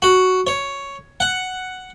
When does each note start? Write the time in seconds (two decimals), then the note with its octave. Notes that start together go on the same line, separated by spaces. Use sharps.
0.02 F#4
0.47 C#5
1.20 F#5